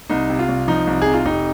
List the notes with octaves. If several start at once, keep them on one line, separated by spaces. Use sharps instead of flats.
C2 D#4
C3
F4
C2
F3 D#4
C2
C3 G#4
F4
F1 D#4